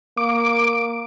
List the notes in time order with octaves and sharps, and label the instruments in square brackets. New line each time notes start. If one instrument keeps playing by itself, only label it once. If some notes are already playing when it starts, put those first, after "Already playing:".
[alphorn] A#3 [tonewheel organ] D6